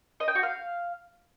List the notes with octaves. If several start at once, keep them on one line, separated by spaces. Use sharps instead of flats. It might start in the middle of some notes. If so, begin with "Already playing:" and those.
D#5
G5
F#4
F5